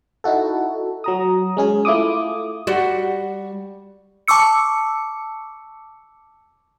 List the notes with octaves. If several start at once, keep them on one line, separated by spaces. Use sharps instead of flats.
D#4 E4 F#4 A4
F#3 A#5 D#6
G#3 C#4 G#4
A3 E4 F4 D6 D#6
G3 F#4
A5 C#6 D6 E6 C#7